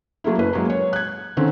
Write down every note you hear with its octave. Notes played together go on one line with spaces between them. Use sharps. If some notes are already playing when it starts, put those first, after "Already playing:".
F#3 A3 A#3 E4
F#1 B4
F#3 G#3 A#3
C#5
F#6 G#6
D3 D#3 C4 C#4